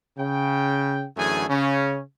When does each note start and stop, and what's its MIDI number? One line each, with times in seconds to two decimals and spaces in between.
0.17 1.05 49
0.17 1.05 79
1.17 1.45 42
1.17 1.45 50
1.17 1.45 52
1.17 1.45 57
1.17 1.45 68
1.17 1.45 80
1.49 2.01 49
1.49 2.01 61